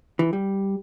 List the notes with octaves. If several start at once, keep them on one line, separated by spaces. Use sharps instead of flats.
E3
G3